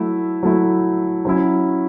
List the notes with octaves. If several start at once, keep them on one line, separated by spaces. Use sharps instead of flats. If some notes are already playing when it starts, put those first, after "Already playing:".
Already playing: F#3 A3 E4
F#3 A3 E4
F#3 C#4 E4